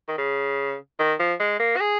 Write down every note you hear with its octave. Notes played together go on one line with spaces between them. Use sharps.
D#3
C#3
D#3
F3
G#3
A#3
F#4
G#4